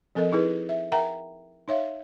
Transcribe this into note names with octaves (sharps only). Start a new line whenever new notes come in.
F3 C4 A4 A#4 D#5
D#4 E4 G#4 B4
E5
A#4 E5 F#5 G5 A#5
D#4 C#5 E5 F5